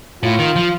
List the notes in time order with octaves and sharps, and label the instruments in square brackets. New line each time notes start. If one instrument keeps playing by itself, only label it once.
[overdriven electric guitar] A2 [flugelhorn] F4
[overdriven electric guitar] D#3
F3